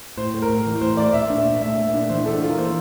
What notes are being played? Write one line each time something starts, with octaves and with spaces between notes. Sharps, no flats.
A2 C5
A3
A#4
A2
E3
A2 C5
A3 D5
A#2 E5
D4
A#2
A3 E5
A#2
D4
E3 C5
D4 A4
E3 F4
A#4
A#3 C5